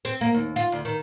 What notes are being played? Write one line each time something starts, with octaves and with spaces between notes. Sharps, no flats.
C4
A#3
D#2
F4
D2
D#3